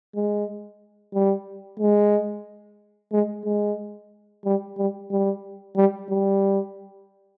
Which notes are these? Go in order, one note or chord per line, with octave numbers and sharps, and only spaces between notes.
G#3
G3
G#3
G#3
G#3
G3
G3
G3
G3
G3